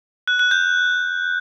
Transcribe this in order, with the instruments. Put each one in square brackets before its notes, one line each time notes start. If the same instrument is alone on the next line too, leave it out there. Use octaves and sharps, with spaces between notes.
[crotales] F#6
F#6
G6